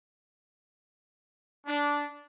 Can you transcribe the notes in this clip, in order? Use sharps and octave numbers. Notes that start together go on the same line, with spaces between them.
D4